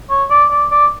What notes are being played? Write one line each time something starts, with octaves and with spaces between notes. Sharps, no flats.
C#5
D5
D5
D5